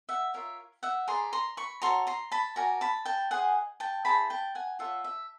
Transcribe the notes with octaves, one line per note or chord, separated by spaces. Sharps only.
E5 F#5
F4 A#4 C#5 E5
E5 F#5
G#4 B4 D5 A#5 C6
A#5 C6
B5 C#6
F#4 A4 C#5 A#5 C6
A#5 C6
A5 B5
F#4 A#4 D5 G#5 A#5
A5 B5
G5 A5
G#4 C5 D#5 F#5 G#5
G5 A5
E4 G#4 C5 A5 B5
G5 A5
F#5 G#5
F4 A4 C#5 E5 F#5
E5